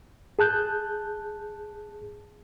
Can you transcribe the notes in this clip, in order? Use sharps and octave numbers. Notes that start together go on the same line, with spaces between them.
G#4 A5 F#6 G6